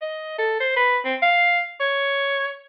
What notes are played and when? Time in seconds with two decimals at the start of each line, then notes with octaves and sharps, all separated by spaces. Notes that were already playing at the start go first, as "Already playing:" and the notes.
0.02 D#5
0.38 A4
0.60 C5
0.76 B4
1.05 C4
1.22 F5
1.80 C#5